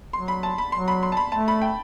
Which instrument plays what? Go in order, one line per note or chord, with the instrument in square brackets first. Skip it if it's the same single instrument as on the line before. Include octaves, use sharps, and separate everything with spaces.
[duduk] F#3 [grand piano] C6
[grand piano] B5
A5
B5
[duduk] F#3 [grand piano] C6
[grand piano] B5
C6
A5
B5
[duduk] A3 [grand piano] A5
[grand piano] B5
G5